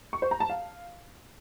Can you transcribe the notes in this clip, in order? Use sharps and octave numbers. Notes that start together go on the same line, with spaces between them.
C#6
C5
A#5
A5
F5